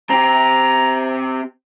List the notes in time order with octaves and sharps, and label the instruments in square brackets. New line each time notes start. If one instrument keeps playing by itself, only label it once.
[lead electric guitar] C4 G4 [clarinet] A#5